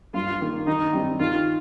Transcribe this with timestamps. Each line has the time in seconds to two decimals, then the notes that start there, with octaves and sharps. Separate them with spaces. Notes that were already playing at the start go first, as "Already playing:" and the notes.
0.14 G2 F4
0.41 D#3 A#3
0.67 D#3 D#4
0.93 G3 C4 D#4
1.19 D#3 F4